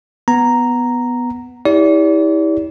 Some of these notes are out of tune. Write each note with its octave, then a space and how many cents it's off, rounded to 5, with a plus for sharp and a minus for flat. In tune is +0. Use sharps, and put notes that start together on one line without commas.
B3 +0 A#5 +0
E4 -35 G4 +25 D5 -40